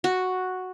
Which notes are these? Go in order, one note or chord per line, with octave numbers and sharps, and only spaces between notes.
F#4